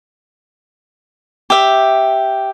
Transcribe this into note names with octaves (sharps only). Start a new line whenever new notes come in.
G4 E5